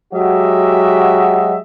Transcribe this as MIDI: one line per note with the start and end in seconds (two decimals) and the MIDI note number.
0.14 1.57 54
0.14 1.57 56
0.14 1.57 66
0.14 1.57 67
0.14 1.57 75
0.14 1.57 76